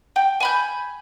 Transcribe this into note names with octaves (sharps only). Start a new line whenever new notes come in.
G5
G#5 B5 G6